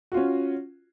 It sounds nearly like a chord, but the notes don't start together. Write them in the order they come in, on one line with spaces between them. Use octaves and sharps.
F#4 F4 C#4